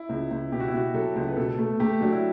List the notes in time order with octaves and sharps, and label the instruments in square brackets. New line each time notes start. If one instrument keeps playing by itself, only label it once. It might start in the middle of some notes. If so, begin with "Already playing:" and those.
Already playing: [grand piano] E4
[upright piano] C#2
C#2
[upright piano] B2 [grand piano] G4
[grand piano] F#4
E4
[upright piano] B2 [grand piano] F#4
[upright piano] F#3 [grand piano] A4
[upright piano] C#2
[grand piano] B4
[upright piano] B2 [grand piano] A4
[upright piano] A3
[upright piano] A3 [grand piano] G4
[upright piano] F#3 [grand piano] D4
[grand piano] E4